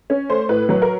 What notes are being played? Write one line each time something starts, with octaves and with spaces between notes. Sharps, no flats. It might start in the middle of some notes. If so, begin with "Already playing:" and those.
C#4
A3 C5
A2 B4
F#3 B4
A#4